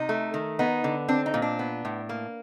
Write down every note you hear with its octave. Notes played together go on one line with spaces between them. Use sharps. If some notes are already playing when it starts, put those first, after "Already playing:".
Already playing: C3 D#4
A3
D#3
B3 D#4
D3
C4 D4
D#4
A#2
D4
B3
A2
A#3